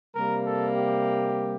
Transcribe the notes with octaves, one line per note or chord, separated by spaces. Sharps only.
C3 G3 A#3 A#4
A4
G4